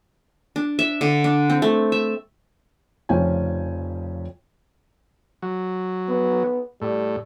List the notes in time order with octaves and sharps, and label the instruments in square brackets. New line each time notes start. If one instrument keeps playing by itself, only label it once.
[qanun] D4
E5
D3
D4
C4
A3
E5
[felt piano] F1 C#3 F3 C#4 G5 G#5
[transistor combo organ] F#3
[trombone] B3
[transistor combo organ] A2 [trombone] G3